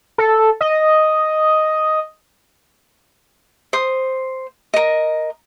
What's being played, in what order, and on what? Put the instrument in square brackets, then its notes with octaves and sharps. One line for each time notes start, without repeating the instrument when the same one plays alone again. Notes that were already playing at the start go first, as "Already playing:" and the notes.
[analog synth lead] A4
D#5
[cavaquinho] C5 D#6
A#4 D#5